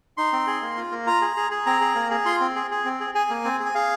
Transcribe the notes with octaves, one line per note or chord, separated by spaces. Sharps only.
D#4 C6
C4
G#4
A#3
F4
A#3
F4 A#5
G#4
G#4
G#4
C4 A#5
G#4
A#3
G#4
F4 C6
C4
G#4
G#4
C4
G#4
G#4 G#5
A#3
C4
G#4
G#5
G#4 F5